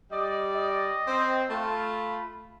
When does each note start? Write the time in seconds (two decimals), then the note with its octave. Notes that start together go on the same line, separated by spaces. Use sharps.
0.12 G3 D5 D#5
0.56 D#5
1.08 C4
1.50 A3 F4 B5